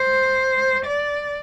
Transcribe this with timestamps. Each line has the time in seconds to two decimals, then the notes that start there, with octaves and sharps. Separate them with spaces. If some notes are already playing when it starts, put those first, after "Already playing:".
Already playing: C5
0.85 D5